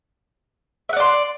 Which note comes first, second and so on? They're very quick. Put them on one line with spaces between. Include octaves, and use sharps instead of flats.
E5 F#5 D5 C6